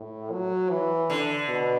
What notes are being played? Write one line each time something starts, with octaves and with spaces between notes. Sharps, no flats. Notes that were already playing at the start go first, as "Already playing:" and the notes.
Already playing: A2
F#3
E3
D3
B2